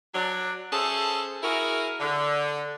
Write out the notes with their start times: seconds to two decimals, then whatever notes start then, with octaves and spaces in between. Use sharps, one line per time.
0.15 F#3 D4
0.73 C#4 G#4 A4 C5 E5 A5
1.43 E4 F#4 G#4 A#4
2.00 D3